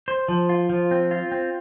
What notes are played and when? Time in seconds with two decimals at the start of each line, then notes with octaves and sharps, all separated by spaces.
0.08 C5
0.28 F3
0.49 F4
0.69 F3
0.91 C4
1.11 F4
1.32 C4